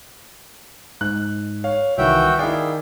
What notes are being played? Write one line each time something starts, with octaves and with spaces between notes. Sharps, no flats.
G#2 F#6
C#5 F5
C2 D#3 E3 F#4 E5 G5
D#3 E4 G#4 D5 F5 G5